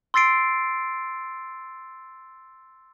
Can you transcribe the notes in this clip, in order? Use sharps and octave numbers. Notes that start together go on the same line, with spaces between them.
C6 E6 A6 C7 D7